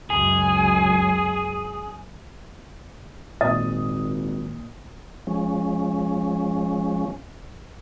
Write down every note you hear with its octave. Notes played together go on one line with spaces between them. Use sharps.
C#2 F#2 G#4
G#1 A#2 D5 D#5 D#6
F3 G#3 C#4